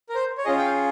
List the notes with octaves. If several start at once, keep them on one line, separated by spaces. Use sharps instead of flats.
A#4
C5
C#5
C#4 F4 G#4 D#5
G5
F5